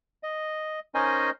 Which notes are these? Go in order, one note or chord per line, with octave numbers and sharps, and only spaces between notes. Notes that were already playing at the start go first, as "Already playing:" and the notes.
D#5
C#4 D#4 A#4 C5 D#5 G#5